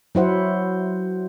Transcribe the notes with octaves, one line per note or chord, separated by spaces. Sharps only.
F#3 E4 C5 F#5